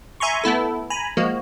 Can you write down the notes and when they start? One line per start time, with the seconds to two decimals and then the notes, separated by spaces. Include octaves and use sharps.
0.20 E5 G#5 A#5 C6 C#6
0.44 A3 B3 E4 A4
0.90 G#5 A#5 B5
1.17 F3 G#3 A#3 F#4